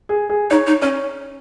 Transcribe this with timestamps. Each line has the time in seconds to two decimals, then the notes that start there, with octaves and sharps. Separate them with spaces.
0.09 G#4
0.30 G#4
0.50 D#4 C#5
0.67 D#4
0.82 C#4 C#5